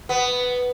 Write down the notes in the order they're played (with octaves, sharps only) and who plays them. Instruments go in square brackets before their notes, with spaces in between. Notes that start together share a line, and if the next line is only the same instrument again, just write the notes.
[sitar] B3